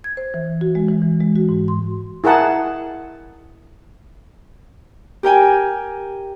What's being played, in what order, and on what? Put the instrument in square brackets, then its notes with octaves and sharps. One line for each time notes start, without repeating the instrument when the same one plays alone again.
[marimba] G#6
C5
E3
F#4
G#3
E3
E3
G#3
F#4
G#2
C6
[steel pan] E4 G#4 A#4 F#5 A5
[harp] G4 A#4 G5 G#5